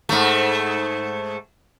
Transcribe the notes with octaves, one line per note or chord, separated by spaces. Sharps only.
G#2 A3